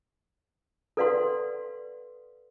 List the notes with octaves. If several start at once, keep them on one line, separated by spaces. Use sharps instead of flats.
A4 B4 D5 F5 F#5 C6